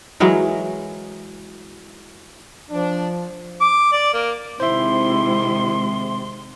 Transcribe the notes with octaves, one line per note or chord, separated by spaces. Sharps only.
E3 F#3 G#3 A#4
F3 D4
D6
D5
A#3
C3 D#3 G#3 E4 C5 E5 C6